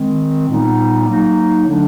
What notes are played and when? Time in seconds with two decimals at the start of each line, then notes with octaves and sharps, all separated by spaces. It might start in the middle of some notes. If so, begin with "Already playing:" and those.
Already playing: D#3 G#3 C4
0.48 A#2 G3 B3 D#4
1.07 F#3 A#3 D#4
1.66 D3 F#3 A3 D4